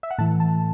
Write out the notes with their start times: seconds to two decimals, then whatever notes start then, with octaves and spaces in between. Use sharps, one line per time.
0.03 E5
0.11 F#5
0.18 A2 E3 A5
0.40 A5